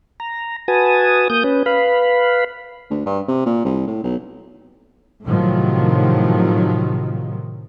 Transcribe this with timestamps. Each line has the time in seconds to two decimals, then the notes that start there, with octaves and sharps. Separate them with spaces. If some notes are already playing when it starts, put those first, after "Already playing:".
0.20 A#5
0.68 F#4 B4 G#5 A5 D#6
1.30 A#3 D#6 G6
1.44 C#4 B4
1.66 B4 F5 B5
2.90 D2
3.06 G2
3.28 C3
3.46 A#2
3.65 C2
3.87 A2
4.04 B1
5.25 A2 C3 D#3 F3 F#3